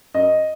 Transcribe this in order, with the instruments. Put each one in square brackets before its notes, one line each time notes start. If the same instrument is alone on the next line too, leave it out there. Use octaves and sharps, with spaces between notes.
[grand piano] F#2 D#5